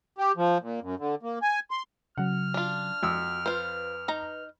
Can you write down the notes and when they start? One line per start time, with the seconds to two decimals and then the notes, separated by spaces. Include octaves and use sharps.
0.18 G4
0.37 F3
0.61 A#2
0.81 F#2
0.99 D3
1.23 A#3
1.42 G#5
1.71 C6
2.18 C#3 F#3 F#5 F6
2.54 D4 F4
3.03 F2 F#4 E6
3.46 F4 B4 C5
4.08 D#4 A#5